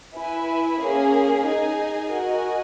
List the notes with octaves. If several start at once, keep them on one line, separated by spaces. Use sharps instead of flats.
E4 B4 E5 G#5
A#3 C#4 G#4
D#4 G#4 D#5 G#5
F#4 A#4 D#5 G#5